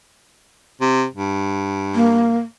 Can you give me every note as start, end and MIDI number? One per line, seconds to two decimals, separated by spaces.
0.81 1.05 48
1.14 2.46 43
1.95 2.38 58